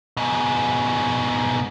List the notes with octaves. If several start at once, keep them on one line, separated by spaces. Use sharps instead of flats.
G#2 B2